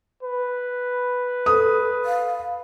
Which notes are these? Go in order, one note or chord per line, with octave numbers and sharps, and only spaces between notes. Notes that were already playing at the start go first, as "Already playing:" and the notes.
B4
A4 D#6
F5